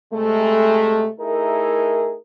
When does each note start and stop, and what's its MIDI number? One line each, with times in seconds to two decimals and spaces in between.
0.13 1.09 48
0.13 1.09 56
0.13 1.09 57
1.20 2.15 57
1.20 2.15 63
1.20 2.15 64
1.20 2.15 68
1.20 2.15 70